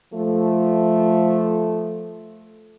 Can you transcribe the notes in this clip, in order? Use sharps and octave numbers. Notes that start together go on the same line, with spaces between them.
F3 A3